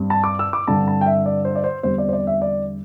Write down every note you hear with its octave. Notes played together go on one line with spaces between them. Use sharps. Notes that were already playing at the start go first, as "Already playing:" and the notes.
Already playing: G2 G3 C4
A5
D6
E6
D6
G2 D3 C4 A5
A5
G5
E5
D5
C5
D5
C5
E2 D3 G3 C4 C5
D5
C5
D5
E5
D5